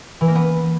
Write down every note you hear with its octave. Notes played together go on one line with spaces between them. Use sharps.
E3
A#3
B3